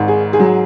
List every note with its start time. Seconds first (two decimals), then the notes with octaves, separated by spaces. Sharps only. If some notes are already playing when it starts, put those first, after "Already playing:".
Already playing: G#1 G#2
0.08 G#4
0.33 G#4
0.39 F#3